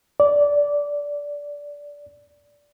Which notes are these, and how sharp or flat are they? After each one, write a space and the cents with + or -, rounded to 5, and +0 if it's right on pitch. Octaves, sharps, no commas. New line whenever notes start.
D5 -15